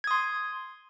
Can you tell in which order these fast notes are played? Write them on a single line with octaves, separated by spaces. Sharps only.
G#6 D#6 C6